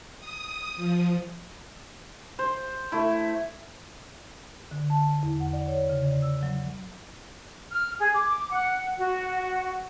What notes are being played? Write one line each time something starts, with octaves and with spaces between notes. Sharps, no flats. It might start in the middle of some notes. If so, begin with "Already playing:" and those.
D#6
F3
C5 C6
A3 E4
D3
A5
E2
F#5
D5
C#5
C#3
D5
E6
F#3
F6
G#4
D6
F#5
F#4